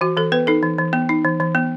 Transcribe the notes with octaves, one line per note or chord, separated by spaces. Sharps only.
E3 F#4
E3 A4
B3 B4
D#4 A4
E3
E3
B3
D#4
E3
E3
B3